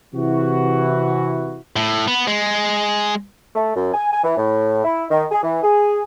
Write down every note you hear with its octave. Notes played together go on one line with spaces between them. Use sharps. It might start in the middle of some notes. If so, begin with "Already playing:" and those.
C3 E3 E4 F#4
A2
B3
G#3
A3
F#2
G#5
G#5
E3
A2
E4
D#3
G#4
E3
G#4